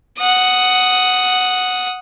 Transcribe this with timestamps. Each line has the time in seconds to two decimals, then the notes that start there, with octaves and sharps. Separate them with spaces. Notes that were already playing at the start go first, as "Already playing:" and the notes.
0.19 F#5 D#6